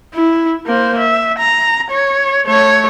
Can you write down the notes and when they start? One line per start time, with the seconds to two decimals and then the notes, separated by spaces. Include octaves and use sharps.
0.14 E4
0.66 A#3 C5
0.98 E5
1.38 A#5
1.91 C#5
2.46 A3 C#5